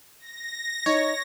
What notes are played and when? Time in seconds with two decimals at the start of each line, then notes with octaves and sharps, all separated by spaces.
0.19 A#6
0.86 D#4 C#5